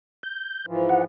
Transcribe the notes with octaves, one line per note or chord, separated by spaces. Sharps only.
G6
G#2 E3 F3
F#5